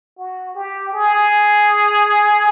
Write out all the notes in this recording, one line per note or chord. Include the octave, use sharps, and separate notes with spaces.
F#4
G4
G#4